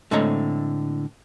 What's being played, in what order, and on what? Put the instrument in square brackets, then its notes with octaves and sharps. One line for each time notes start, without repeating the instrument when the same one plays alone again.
[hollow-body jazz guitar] A2 D3 G#3 C4 C#5 A#5